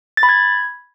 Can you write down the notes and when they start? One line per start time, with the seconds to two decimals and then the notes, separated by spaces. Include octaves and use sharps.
0.17 A6
0.23 B5
0.29 G#6